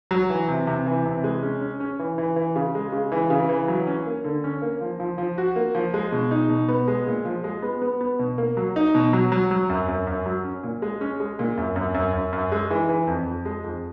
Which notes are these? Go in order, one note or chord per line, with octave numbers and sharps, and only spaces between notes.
F#3
E3
C3
C3
E3
C3
G#3
C#4
C#4
C#4
E3
E3
E3
C#3
G#3
C#3
E3
C#3
E3
F#3
C#4
A#3
D3
C#4
A#3
F3
F3
F3
F#4
A#3
F3
G#3
B2
D#4
B2
B3
G#3
A#2
F3
G#3
B3
B3
B3
B2
A#3
F#3
D#4
B2
F#3
F#3
F#3
F#2
F#2
F#2
F#3
C#4
A#2
G#3
C#4
G#3
A#2
F#2
F#2
F#2
F#2
F#2
G#3
E3
E3
F2
F2
G#3
F2